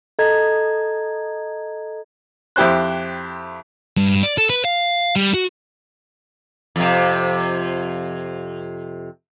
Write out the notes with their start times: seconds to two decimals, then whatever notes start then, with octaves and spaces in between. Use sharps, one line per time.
0.19 A4 D#5 A#5 G#6
2.56 F2 E4 G4 C5 F#6
3.97 G2
4.23 D5
4.38 A4
4.50 B4
4.65 F5
5.16 G3
5.34 F#4
6.76 F2 C3